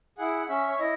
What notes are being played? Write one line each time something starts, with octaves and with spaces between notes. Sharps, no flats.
E4 G#4 F#5
C#4 E5
C#5
E4 D#5